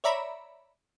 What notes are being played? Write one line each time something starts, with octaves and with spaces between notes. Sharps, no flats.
C#5 D5 E5 A#5 B5